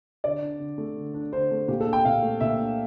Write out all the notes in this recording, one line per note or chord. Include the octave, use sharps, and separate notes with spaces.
D3 D5
D4
D3
A3
D3
D4
D3 C5
A3
A#2 G4
A4
D4
G5
A#2 F5
A3
A#2 E5
D4